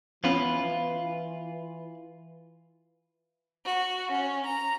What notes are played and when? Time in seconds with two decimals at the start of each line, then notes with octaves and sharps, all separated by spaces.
0.24 E3 F3 B3 C#4 F4 B4
3.66 F#4
4.09 C#4
4.46 A#5